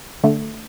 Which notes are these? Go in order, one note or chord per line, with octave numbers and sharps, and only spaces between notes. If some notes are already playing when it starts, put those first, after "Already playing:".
D3 A3